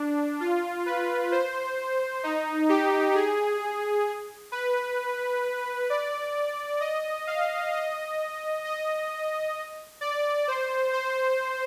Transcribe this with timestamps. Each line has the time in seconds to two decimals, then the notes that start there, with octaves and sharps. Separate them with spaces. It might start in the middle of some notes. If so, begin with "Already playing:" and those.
Already playing: D4
0.40 F4
0.86 B4
1.32 C5
2.23 D#4
2.69 G4
3.14 G#4
4.52 B4
5.90 D5
6.80 D#5
7.27 F5
7.73 D#5
8.65 D#5
10.01 D5
10.48 C5
10.93 C5